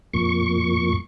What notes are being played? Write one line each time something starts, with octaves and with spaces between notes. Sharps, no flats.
F2 A#2 C#6